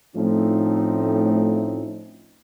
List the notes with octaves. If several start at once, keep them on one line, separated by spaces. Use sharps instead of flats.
A2 F3 A3 C4 C#4 D#4